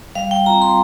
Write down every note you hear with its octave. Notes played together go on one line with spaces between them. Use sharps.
G3 F5
G5
C4 F4 A#5
C6